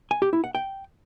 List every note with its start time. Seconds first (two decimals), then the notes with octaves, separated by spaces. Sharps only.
0.11 G#5
0.22 G4
0.33 E4
0.44 F#5
0.55 G5